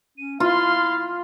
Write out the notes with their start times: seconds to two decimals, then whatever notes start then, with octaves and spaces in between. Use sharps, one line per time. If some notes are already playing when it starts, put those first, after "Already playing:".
0.18 C#4 D#7
0.40 E4 F4 F5 C6